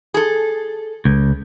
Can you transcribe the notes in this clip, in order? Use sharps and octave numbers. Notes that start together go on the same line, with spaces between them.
G#4 A4
C#2